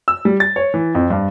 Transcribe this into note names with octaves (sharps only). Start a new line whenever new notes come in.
E6
G3
A6
C#5
E3
F2
G2